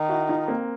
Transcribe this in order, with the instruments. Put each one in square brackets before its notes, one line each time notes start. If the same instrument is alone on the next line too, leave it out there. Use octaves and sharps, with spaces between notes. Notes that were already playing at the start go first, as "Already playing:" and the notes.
Already playing: [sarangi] D#3
[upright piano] E4 F#4
D#4 F4
A#3 C4